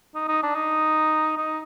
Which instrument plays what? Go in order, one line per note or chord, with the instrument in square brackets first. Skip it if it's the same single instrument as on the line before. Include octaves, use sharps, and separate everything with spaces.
[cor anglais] D#4
D#4
D4
D#4
D#4